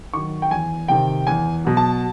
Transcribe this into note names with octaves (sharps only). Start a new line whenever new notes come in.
D#3 F#3 C#6
G5
E2 G#5
C3 D#3 G5
E2 G#5
B2 F#3
A5